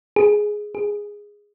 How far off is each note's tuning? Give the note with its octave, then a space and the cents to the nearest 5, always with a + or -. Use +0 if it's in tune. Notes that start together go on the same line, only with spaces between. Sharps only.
G#4 +5
G#4 -10